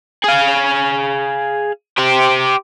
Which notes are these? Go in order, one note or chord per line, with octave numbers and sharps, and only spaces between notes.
G#4 F5
G4 C5